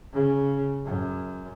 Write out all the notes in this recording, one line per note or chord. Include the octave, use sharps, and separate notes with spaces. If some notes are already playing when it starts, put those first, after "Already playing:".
C#3
F#2